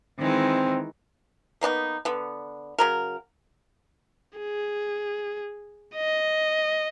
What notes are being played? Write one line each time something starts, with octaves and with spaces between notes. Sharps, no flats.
D#3 E3 G#3 C4
A#3 B3 D4 D#4
D3 B3
C#3 F#3 A#4
G#4
D#5